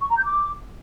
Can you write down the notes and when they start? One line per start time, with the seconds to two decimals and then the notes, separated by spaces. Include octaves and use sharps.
0.01 C#6
0.09 A#5
0.17 G6
0.25 D6